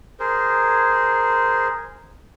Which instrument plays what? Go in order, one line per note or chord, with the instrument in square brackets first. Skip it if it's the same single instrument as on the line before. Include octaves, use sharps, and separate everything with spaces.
[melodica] G#4 A#4 C5